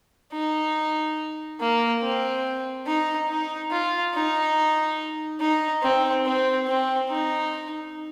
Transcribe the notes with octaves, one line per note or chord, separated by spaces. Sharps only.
D#4
A#3
C4
D#4
D#4
F4
D#4
D#4
C4
C4
C4
D#4